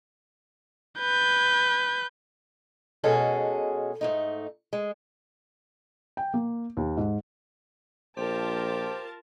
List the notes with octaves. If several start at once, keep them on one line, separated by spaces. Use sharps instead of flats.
B4 G6
B2 G#3 C#4 F#4 G#4 A4
G#2 A3 D#4
G#3
G5
A#3
D#2
G#2
A#1 F4 G4 A#4 C5 A5